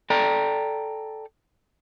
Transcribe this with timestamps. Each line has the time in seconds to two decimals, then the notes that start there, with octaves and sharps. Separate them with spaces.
0.10 A4 D5 G5 A#5